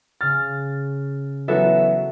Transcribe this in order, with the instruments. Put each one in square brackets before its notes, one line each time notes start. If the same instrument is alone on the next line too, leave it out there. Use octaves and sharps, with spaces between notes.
[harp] C#3 F6 [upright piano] A6
[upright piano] E3 F#3 B3 [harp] F#4 A4 E5